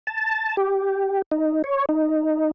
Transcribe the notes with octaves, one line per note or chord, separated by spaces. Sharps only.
A5
G4
D#4
C#5
D#4